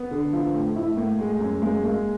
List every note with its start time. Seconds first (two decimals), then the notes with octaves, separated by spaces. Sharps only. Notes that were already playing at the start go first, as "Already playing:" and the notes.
Already playing: B3
0.11 D3
0.33 F3 F4
0.54 A2
0.75 A2 E4
0.97 A2 A#3
1.19 G#3
1.40 F#2
1.62 G#3 A#3
1.83 G#3 A#3